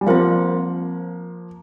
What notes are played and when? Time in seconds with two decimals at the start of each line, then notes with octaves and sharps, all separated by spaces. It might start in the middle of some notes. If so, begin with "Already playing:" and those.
0.01 G3
0.06 F3 A#3 C4 F4 C5 F5